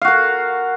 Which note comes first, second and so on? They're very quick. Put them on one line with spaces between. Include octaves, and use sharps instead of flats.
F5 F#4 A#4